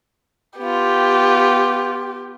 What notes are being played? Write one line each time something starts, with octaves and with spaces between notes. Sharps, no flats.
B3 F4 G4